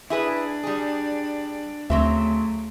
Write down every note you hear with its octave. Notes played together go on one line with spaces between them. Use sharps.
D4 E4 G#4 B4
G3 G#4
D2 C#3 F#3 A3 C4 E5